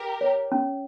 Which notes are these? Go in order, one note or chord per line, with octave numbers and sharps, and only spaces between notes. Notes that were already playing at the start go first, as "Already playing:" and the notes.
Already playing: G4 A#4
C#5
C#4